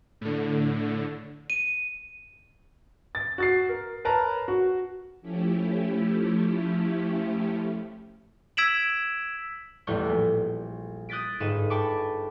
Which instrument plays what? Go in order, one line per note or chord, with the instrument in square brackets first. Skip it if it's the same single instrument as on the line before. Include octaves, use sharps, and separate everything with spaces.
[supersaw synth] A2 D3
[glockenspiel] D#7
[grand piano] A6
F#4 A6 C7
A#4
A#4 B4 C#5 A5 A#5
F#4
[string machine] F3 A3 C#4 E4 G4
[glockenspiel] E6 G#6 B6 D7 E7 F#7
[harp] A1 E2 A2 G3 C#6 G6
A#1
D#6 F#6 G6 A6 B6 D7
G1 G#2 D#4 B4 D#7 E7
G5 A5 B5 C#6 D6